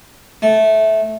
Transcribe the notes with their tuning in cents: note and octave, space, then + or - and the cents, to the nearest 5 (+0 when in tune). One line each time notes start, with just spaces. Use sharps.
A3 -15